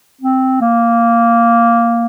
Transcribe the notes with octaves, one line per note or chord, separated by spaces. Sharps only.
C4
A#3